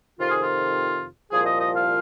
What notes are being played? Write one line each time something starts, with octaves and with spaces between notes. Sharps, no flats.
F2 C3 D#3 F4
G#4
F4
C2 A#2 F3 G#4
D#5
D#5
F5